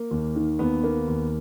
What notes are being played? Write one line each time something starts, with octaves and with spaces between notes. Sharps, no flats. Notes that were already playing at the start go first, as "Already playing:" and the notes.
Already playing: A#3
D#2
D#3
D#2 B3
A#3
D#2